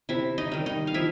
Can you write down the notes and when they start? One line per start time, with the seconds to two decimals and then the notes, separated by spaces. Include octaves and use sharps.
0.09 C3 E4 E5
0.38 D#4 D#5
0.52 D#3 G3
0.66 D#4 D#5
0.87 F5
0.94 F3 E4 E5